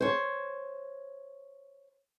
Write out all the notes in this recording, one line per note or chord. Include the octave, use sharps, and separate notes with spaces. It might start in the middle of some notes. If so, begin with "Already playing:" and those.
C5 C#5